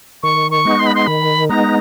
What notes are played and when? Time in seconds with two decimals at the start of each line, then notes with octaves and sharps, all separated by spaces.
0.23 D#3 C#6
0.51 C#6
0.65 G#3 B3 D#4
0.79 C6
0.87 B5
0.95 C6
1.07 D#3 B5
1.49 G#3 B3 D#4 A#5